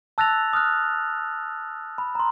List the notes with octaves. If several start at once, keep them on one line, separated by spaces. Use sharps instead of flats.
A5 E6 F#6 A6 A#6 F7
D#6 F6 F#6
B5
A#5 C6